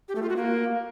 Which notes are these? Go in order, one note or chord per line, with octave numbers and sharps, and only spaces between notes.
G4
A3
F4
F#4
A#3